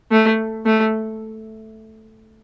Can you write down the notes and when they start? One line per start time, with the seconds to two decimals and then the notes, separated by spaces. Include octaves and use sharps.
0.12 A3
0.66 A3